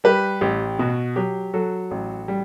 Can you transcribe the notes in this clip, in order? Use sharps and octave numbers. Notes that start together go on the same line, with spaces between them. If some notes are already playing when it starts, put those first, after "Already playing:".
G3 G4 B4
A1 G4
B2 F#4
F#3 G4
F#3 F#4 A4
A1
G3